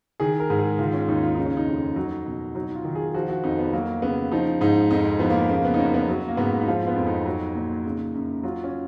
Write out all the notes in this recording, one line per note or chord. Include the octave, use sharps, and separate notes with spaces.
D#3 G#4
A#4
G#2
G#4
D#3 F4
C#4
D#2 D#4
F4
C#3 D#4
C#4
D#4
F2
F#3
B2
F#3 D#4
F4
D#3
G#4
F3 F#4
F#4
F2 D#4
B3
F#3 A#3
C#3 B3
F3 D#4
G#2 D#4
F2 D#4
F3 B3
A#3
C#3 A#3
B3
D#4
F#2 C#4
B3
F#3
A#3
G#2 B3
D#4
F3 F4
B3
F2
D#4
F#3
A#2
C#3
F#2
F#3 F4
C#4